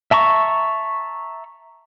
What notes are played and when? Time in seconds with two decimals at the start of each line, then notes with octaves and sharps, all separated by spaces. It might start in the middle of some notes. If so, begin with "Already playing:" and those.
0.11 E5 A5 A#5 C#6